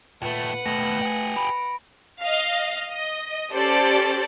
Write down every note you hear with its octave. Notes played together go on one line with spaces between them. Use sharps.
D#2 A#2 A3 B4 F#5
D#2 B2 A3 A#6
G4 G#4
B5 D7
D#5 F5
D#5
C#4 G4 A4 C5 D5